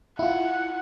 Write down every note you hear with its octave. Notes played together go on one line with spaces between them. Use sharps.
E4 F4 F#5